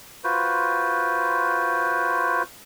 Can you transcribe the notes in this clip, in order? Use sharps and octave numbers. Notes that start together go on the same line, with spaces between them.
F4 F#4 B4 C5